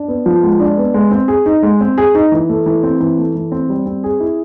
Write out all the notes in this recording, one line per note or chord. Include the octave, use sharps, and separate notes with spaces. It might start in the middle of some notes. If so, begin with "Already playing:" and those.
Already playing: D4
B3
F3
G#3
D4
B3
G#3
C4
G#4
D#4
G#3
C4
G#4
D#4
E3
A3
E3
C4
E3
A3
E3
C4
G3
C4
G#4
E4